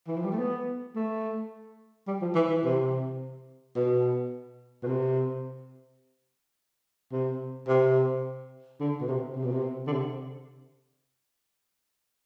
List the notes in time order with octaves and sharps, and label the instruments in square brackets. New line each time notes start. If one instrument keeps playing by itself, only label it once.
[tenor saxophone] E3
F3
G3
A3
B3
A3
G3
F3
E3
E3
C3
B2
B2
C3
C3
C3
D3
B2
C3
C3
B2
C3
D3
C3